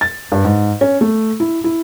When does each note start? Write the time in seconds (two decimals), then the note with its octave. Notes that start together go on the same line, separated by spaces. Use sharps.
0.01 A6
0.32 G2
0.45 G#2
0.81 C#4
1.01 A3
1.40 E4
1.64 E4